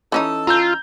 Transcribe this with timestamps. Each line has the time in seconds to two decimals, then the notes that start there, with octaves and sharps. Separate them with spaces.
0.12 E3 C#4 D#4 A4 A5
0.47 F4 A#5 E6 G6